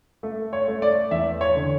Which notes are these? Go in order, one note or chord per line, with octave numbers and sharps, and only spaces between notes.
A3
C#5
A3
D5
E2 E5
C#5
D3